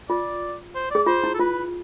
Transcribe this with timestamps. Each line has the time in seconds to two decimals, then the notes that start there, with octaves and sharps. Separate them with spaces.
0.09 F4 D5
0.75 C5
0.91 G#4 D5
1.06 F4 C5
1.24 E4
1.35 A4
1.40 F4 B4